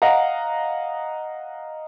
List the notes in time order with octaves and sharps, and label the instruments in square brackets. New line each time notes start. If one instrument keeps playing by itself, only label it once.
[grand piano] D#5 F5 F#5 A#5